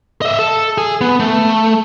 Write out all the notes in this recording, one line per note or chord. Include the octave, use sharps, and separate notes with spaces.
D#5 E5
A4
G#4
B3
A3